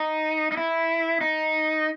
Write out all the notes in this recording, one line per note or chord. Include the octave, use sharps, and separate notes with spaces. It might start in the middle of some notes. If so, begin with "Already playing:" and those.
Already playing: D#4
D#4
E4
D#4